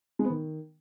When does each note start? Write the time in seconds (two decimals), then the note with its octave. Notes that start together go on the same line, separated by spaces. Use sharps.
0.19 G#3
0.25 B3
0.30 D#3